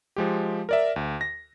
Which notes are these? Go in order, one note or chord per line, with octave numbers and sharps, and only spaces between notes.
F3 G#3 G4
A#4 D5 E5
D2
A#6